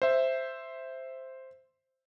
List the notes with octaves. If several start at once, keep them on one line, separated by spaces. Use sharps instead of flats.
C5 E5